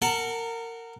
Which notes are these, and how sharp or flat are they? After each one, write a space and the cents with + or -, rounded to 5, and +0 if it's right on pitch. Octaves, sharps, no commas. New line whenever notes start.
A#4 -20 F#5 +0 A5 +0